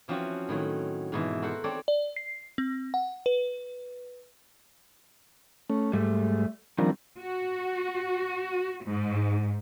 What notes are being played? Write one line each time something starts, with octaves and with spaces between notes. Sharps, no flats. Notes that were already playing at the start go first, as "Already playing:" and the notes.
E3 F3 C4 C#4 F#4
A2 D#3 F#3
G#2 B2 E3
F#4 A4 A#4 C5 F#5
C4 A4 C#5 D5
D5
C7
C4
F#5
B4
A3 C#4
G#2 G3 A3
D#3 F3 G3 C4 D4 A#4
F#4
G#2